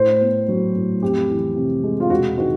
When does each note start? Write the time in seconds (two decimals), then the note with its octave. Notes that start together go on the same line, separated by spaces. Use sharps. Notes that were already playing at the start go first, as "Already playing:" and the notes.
Already playing: A2 C5
0.21 B3
0.48 F#3
0.75 A2
1.02 F2 G4
1.30 E3
1.56 C3
1.84 G#3
2.00 F4
2.10 E1 F#4
2.38 D#3 F#4